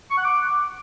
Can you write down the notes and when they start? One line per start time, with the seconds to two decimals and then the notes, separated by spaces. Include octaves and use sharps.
0.11 C#6
0.18 F#5
0.24 D6